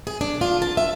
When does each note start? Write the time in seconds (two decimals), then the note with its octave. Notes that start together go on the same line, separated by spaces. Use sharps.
0.07 G#4
0.21 D4
0.41 F4
0.62 A5
0.77 E5